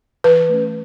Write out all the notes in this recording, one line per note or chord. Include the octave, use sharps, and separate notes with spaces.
E3 B4
A3 C#4